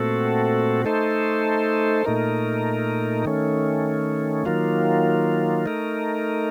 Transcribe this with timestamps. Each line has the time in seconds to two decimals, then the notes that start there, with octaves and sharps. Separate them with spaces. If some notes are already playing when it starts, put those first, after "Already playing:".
Already playing: A#2 A3 C4 F#4 A4
0.85 A3 D#4 A4 C5
2.05 A#2 A3 D#4 A#4
3.25 D#3 A3 C#4
4.46 D#3 F#3 A#3 F4
5.66 A3 D#4 A#4